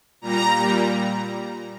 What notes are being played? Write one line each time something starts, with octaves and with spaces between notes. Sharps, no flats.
A#2 G3 A#5
A#2 G3